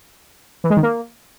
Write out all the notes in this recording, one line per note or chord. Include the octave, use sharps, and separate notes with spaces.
E3
G#3
D#3
A#3